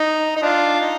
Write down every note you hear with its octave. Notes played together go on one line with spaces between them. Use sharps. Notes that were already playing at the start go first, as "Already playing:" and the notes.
Already playing: D#4
D#4
D4 F4
D#4